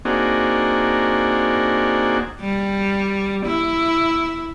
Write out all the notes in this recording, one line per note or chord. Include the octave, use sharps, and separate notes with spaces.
A#3 C4 D4 D#4 F#4 G#4
G3
E4